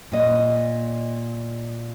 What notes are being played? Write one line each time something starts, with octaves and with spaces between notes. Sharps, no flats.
A#2 D#5